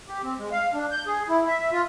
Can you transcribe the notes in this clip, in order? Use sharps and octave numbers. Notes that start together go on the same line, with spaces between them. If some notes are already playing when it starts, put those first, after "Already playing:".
G4
C4
G#3
F5
D4
G6
G#4
E4
E5
F4